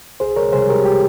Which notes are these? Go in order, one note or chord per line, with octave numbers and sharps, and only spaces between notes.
C2 G#4 C5
A#4 C#5
C3 G3 G#4 C5
G4 A#4
G4